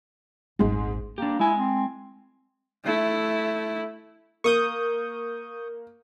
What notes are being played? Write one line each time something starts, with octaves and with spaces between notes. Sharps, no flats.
D#1 G#1 G#2 G#3
A#3 D4 G4
G#3 E4 G#5
C4
A3 E4
A#3 C#6 D#6 G6